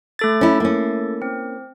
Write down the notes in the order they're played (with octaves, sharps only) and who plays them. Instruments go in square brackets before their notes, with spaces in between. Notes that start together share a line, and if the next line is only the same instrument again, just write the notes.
[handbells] A3 A4 A6
[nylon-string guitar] C#4 E4
A#3 C#4
[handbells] C4